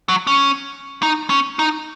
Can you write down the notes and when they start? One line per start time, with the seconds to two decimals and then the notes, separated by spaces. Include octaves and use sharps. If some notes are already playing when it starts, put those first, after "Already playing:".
0.09 F#3
0.27 C#4
1.03 D#4
1.30 C#4
1.59 D#4